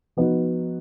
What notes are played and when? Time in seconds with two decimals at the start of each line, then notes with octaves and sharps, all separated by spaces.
0.17 F3 B3 D#4 F#4